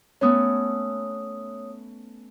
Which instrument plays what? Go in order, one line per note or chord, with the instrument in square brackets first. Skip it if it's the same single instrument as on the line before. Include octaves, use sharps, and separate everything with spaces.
[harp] A3 B3 C#4 [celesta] C#5 D#6